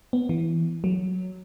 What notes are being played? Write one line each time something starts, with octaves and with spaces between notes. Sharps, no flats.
B3
E3
F#3